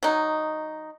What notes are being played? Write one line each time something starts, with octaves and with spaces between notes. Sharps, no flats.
F#3 D#4